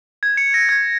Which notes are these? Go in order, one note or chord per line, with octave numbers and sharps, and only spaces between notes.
G#6
C#7
A#6
G#6